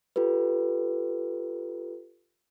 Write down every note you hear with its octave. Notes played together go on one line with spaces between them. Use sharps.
F4 G4 A4 B4